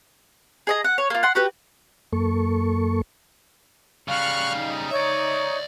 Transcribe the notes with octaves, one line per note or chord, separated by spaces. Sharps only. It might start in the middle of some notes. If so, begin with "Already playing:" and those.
G#4 D#5 A#5
F#5
C#5
A#3 F4
F#5 C6
F#4 G4 B4
F#2 A#3 A4 C#6
C#3 G3 F5 C#6 F6 F#6
D#4
C#5 D5 E5